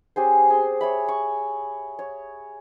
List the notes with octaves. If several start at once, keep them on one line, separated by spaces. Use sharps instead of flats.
C#4 G4 G#4 C5
C4 G#4 C6
C#5 E5 B5
C#6
C#5